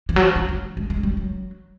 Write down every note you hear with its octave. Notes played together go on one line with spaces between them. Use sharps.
E3
F#3
F3
F3
E3
G#3
G#3
G3
F#3